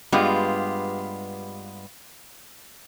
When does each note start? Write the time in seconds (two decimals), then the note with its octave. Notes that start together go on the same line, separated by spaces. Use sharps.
0.12 G2 G#3 B3 F4 G4